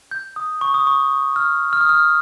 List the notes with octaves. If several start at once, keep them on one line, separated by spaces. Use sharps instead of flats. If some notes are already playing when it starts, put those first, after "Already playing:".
G6
D#6
C#6
D#6
C#6
F6
F6
D#6
F6